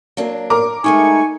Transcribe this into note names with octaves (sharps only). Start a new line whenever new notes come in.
F#3 A#3 D4
A#4 A#5 D6
G#3 A3 D#4 E4 G#5 C#6